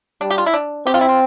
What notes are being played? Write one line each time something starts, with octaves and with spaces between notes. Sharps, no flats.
G3 D4
G4
F4
E4
D4
C4 G4
F4
E4
F4